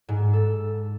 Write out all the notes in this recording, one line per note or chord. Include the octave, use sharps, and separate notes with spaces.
G#2
A4